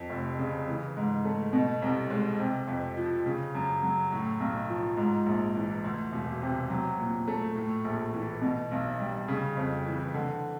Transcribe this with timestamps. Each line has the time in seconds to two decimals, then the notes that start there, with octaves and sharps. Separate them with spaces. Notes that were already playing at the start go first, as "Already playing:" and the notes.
Already playing: F2
0.10 F1
0.39 C#3
0.68 E3
0.97 G#2
1.25 A3
1.53 B2
1.82 C2
2.10 G#3
2.39 C3
2.68 F2
2.97 F3
3.26 C#3
3.55 F#2
3.83 F#3
4.12 A2
4.40 B1
4.69 F3
4.97 G#2
5.26 A#1
5.55 E3
5.84 D2
6.12 E1
6.41 C3
6.70 F#3
6.98 A#2
7.28 A3
7.55 A2
7.84 A#1
8.13 E3
8.42 B2
8.71 B1
9.00 G3
9.28 C#3
9.57 F2
9.86 E3
10.14 D3